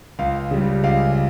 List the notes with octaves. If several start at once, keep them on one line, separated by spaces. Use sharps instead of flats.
C#2 F5
C#3 G3
C#2 F5